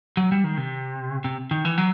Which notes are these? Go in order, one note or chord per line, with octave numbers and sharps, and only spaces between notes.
F#3
G3
D#3
C3
C3
D#3
E3
F#3